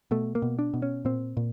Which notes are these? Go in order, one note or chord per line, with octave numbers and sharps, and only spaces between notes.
B2 A3
A#3
B2
D4
B2
C#4
A#2 C4
A#2